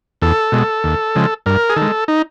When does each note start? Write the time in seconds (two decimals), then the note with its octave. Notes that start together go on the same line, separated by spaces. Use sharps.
0.22 E2 A4
0.52 B2 G#3
0.84 D#2
1.15 C#3 F3 G#3
1.46 G2 A#4
1.70 G#4
1.76 D#3 A4
1.82 G#3
2.08 D#4